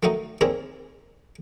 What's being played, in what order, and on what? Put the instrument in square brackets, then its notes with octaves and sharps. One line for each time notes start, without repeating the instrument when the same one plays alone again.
[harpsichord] D#3 F#3 A3 D#4 D#5
D#2 C4 D4 G#4 A#4